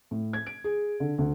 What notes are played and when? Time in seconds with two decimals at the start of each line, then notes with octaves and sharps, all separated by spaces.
0.11 A2
0.33 G#6
0.46 D7
0.64 G#4
1.00 D3
1.18 D2